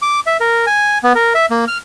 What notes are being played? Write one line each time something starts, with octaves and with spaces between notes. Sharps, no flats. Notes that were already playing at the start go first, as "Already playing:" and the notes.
D6
E5
A#4
G#5
B3
A#4
E5
A#3
F6